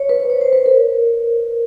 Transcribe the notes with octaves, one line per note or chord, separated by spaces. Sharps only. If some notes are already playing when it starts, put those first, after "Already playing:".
Already playing: C#5
B4
C5
C#5
C5
B4
A#4